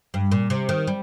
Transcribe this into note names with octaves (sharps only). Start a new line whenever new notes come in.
G2
A#2
C3
D#3
G3